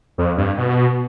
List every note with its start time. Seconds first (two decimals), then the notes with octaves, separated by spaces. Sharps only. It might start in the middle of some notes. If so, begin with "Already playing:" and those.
0.18 F2
0.37 G2
0.58 B2